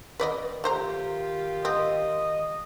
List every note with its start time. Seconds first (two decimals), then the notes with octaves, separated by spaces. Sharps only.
0.20 D#3 B4 D5 D#5
0.64 A3 F4 G4 C5 A#5
1.65 C4 D#5